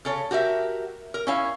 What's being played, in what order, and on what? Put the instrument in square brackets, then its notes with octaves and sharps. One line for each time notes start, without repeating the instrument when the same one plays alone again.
[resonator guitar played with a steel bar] C#3 A4 C#5
F#4 G4 A#4 E5
A#4
C#4 E4 F5